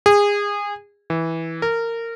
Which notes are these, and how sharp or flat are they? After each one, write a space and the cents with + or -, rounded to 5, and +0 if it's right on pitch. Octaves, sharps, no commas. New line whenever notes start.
G#4 -25
E3 -10
A#4 -20